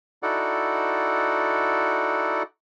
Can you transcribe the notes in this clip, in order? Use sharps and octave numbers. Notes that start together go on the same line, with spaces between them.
D#4 E4 F#4 A4 D5 F#5